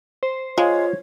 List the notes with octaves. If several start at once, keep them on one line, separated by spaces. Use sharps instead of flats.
C5
G#3 F4 C#5